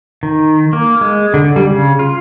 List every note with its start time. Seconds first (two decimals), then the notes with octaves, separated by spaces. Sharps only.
0.23 D#3
0.73 A#3
1.01 G#3
1.34 D3
1.56 G3
1.70 C#3
1.99 F4